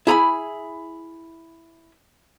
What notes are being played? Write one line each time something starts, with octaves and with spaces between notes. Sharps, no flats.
E4 G#4 A#5 B5